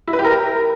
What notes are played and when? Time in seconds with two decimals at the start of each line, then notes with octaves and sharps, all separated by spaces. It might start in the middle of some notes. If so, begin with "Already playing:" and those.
0.07 E4
0.13 B4
0.19 G4
0.24 A#4